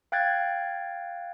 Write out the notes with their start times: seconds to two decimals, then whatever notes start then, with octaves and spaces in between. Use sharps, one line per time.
0.12 F5 G5 F#6 G#6 A6